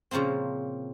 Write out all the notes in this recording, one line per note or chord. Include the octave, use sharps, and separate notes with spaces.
A#2 C#3 F3 A#3 C4